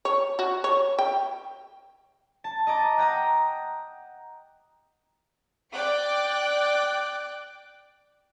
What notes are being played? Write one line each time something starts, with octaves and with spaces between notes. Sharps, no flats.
C#5
F#4
C#5
G5
A5
D#5 A#5 D6 A6
F#5 G5 A#5 D#6
D5 G5 D6 F#6